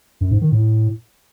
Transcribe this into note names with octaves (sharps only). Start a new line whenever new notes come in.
F#2
G#2
D#3
A2